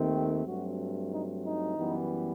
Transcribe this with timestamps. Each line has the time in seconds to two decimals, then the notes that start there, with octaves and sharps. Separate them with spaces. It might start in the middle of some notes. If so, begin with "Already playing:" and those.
Already playing: D#2 D#3 A3 C4
0.13 G4
0.45 G2 F#3 A3 C4 F#4
1.12 D#4
1.44 D#4
1.76 F#2 E3 G3 B3